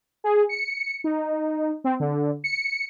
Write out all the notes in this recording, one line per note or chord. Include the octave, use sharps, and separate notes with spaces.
G#4
C#7
D#4
C4
D3
C#7